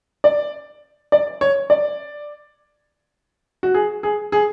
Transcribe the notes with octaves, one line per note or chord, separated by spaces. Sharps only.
D5
D5
C#5
D5
F#4
G#4
G#4
G#4